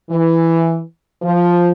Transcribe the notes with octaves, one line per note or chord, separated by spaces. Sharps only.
E3
F3